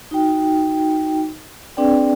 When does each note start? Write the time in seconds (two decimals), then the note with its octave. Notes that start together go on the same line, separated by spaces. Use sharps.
0.11 D#4 F#4 G5
1.77 C4 D4 G#4 B4 D5 G5